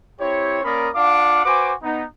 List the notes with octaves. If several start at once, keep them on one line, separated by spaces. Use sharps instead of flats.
C4 E4 G4 C#5
A#3 C#4 A#4 D5 B5 D#6
D4 F4 F5 F#5 D6
F#4 B4 C5 G#5 D6
B3 D#4